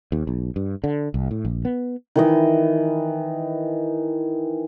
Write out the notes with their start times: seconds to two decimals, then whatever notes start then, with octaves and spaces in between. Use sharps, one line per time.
0.12 D#2
0.27 B1
0.56 G2
0.84 D3
1.14 C2
1.31 A2
1.45 A#1
1.65 B3
2.16 D#3 E3 D#5